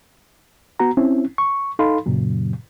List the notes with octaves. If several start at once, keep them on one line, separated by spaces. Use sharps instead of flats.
B3 F#4 A#5
C4 C#4 E4
C#6
D#4 A4 F5 B5 C6
F#2 A#2 C#3 F#3